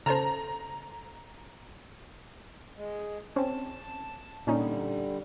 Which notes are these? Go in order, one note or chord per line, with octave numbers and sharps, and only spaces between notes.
C#3 C#4 A4 C5 A5 A#5
G#3
C4 C#4 A5
A#2 D3 G3 C#4 D#4